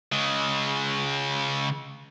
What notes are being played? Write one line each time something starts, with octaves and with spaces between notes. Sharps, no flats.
C#3 G#3